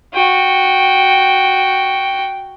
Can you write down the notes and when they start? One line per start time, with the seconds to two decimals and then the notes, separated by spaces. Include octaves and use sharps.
0.14 F#4 G5